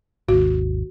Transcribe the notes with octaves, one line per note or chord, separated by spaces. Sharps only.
G#1 D#2 F#4